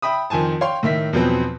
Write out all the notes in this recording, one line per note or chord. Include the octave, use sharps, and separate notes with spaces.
E5 G5 B5 D#6
F2 D#3 F3 G#5 A5
C#5 F5 G5 C6
A2 D#3 E5 B6
E2 B2 F3 F#3 B3 C4